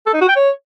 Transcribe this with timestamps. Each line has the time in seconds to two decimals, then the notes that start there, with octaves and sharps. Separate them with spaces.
0.06 A4
0.14 D#4
0.21 F#4
0.29 G5
0.36 C#5